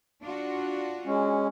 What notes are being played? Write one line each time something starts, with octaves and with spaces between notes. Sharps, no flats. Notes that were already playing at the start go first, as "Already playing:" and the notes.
D4 F4 F#4
G#3 C#4